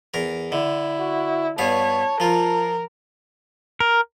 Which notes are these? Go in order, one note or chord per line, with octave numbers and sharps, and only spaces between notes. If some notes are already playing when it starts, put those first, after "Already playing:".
E2 A#4
D3 E4
F#4
G2 B3 C#5 F5 A5
F3 F4 A#4
A#4